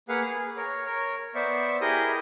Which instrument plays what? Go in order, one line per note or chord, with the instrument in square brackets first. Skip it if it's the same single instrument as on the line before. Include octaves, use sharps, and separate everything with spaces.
[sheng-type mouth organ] A#3 G#4 B4 F5 F#5
G#4
A#4 C#5
A#4 C#5
B3 C5 D5 E5 C#6
E4 G4 G#4 A#4 D#5 D#6